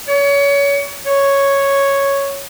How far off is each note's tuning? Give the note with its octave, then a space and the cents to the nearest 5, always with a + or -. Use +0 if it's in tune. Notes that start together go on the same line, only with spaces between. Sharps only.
C#5 +30
C#5 +0